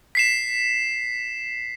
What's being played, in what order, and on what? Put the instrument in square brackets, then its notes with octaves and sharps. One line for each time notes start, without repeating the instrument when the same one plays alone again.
[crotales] B6 C7 E7